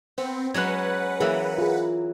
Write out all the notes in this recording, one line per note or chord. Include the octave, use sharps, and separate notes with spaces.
B3 C4
F#3 G#3 C#4 B4 F#5 F#6 G#6
E3 F#3 A#3 G#4 E5
F4 G#4